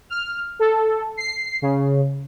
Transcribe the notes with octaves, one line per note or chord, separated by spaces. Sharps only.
F6
A4
C7
C#3